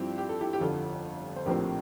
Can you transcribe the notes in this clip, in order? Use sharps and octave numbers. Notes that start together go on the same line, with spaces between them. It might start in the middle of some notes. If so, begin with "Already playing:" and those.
Already playing: G2 F3 C4 E4 G4
G4
A4
E4 G4
G4
G1 F2 D3 F4 A4
C5
A#1 A2 F3 C4 G4 A#4